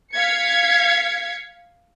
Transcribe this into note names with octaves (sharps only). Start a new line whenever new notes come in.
F5 G#6 B6 C#7